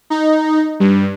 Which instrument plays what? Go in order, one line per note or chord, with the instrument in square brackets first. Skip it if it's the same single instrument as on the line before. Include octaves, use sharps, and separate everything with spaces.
[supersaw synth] D#4
G2